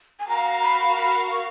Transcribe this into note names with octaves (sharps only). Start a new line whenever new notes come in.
G#5
F#4 A#4 F5 A#5
B5
B5
C#6